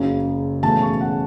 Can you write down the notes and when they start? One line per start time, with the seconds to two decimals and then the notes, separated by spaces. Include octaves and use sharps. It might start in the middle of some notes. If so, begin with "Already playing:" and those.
Already playing: F#1 F#2 C#3
0.63 E1 E2 C#3 A3 C#4 A5
0.82 C#6
1.01 F#5